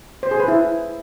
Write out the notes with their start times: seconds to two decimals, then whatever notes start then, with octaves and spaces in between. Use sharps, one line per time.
0.23 C5
0.31 G#4
0.40 B4
0.48 E4